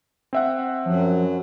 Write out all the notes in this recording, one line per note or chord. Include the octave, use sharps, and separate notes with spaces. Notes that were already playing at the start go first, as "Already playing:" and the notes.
C4 E5 F#5
F#2 F3 F#3